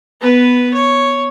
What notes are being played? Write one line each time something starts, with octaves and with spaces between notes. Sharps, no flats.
B3 B4
C#5